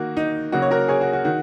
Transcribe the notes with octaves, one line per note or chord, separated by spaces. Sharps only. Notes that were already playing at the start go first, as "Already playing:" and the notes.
Already playing: D#3 A#3 F#4
D#4
C#3 F#3 A#3 F#4
C#5
F#4 A#4
G#4 C#5
F#4
F#4
D#3 F#4